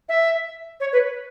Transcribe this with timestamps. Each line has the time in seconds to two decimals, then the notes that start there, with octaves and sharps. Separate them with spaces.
0.09 E5
0.80 C#5
0.93 B4